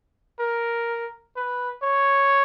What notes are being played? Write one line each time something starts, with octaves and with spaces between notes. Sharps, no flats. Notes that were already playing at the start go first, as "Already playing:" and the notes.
A#4
B4
C#5